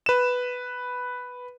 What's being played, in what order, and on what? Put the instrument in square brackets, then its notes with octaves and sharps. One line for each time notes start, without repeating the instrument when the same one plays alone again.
[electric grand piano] B4 E7